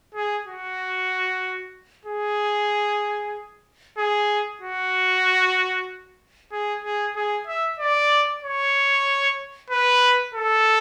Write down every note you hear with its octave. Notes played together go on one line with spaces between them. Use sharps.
G#4
F#4
G#4
G#4
F#4
G#4
G#4
G#4
E5
D5
C#5
B4
A4